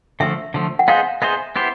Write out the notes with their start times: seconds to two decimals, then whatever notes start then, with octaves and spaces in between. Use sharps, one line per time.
0.20 D3 F3 A3 E5
0.54 D3 F3 A3
0.79 F#5
0.88 B3 D#4 G#4 C5 F5
1.22 B3 D#4 G#4 C5 E5
1.56 B3 E4 G4 C5